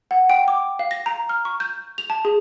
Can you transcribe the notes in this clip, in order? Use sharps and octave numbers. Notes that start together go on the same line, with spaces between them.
F#5
G5
D6
F5
A#6
A#5
F6
C#6
G6
F7
A5
G#4